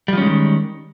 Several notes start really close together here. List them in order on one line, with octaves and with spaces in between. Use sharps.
G3 F3 C#4 G#3 D#3